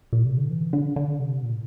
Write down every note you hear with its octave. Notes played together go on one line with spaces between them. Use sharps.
A#2
C3
D3
E3
D3
D3
C3
A#2
A2